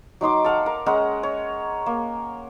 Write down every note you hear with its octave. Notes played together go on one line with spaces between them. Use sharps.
F#3 D#4 C6 D6
A4 F5 F#5 D6
A#4
G#3 C#4 A#4 F#5
C#5
A#3